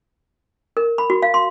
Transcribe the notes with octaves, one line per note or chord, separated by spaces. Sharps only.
A#4
B5
F#4
F5
C6